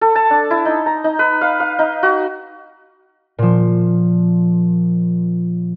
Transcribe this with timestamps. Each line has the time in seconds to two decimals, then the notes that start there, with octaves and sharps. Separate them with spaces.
0.01 A4
0.15 A5
0.31 D4
0.50 E4
0.65 D#4
0.86 A#5
1.04 D#4
1.19 B4
1.41 F5
1.60 F5
1.79 D#4
2.03 F#4
3.38 A#2 F3